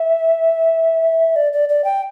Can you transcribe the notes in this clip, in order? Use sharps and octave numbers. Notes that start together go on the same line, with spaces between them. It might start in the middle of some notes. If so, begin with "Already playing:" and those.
Already playing: E5
D5
D5
D5
G5